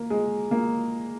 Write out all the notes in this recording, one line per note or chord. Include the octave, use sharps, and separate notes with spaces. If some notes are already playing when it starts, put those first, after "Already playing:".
Already playing: A#3
G#3
A#3